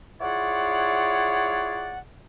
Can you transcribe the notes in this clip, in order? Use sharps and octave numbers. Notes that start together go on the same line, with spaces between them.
E4 F4 G#4 C#5 D5 F#5